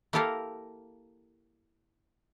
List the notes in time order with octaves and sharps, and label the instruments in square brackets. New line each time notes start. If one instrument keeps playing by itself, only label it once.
[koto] A#3 E4 G4 A4 A#4 F5